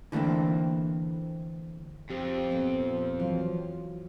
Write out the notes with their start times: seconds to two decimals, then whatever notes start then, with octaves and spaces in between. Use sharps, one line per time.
0.12 D3 E3 A3 A#3 C4
2.10 F2 G4 C5
2.51 A#2 B3 C4
3.19 E3 F#3 F4